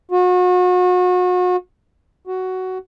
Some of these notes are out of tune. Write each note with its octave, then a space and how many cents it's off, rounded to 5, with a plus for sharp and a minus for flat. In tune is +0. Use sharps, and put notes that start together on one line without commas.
F#4 -35
F#4 +10